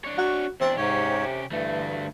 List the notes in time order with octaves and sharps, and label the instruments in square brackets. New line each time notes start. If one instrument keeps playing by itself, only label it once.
[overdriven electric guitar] D4 C#5
[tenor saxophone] F#4
[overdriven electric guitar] E2 D4 [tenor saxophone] C4
[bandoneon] G#2 C#5 [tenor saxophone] C3 [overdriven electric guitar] C#4 G4
[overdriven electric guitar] D2 A3 [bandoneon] G2 [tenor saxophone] E3